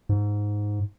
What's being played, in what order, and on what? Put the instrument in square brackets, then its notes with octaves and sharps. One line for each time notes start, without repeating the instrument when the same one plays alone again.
[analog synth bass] G#2